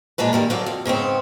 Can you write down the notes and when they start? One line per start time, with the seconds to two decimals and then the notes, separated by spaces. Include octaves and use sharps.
0.18 A#2 G#3 D4 B4
0.33 D#3 G3 A#3
0.50 D3 F#3 C4 D5 F5
0.66 F2
0.85 G#2 C#3 B3 C4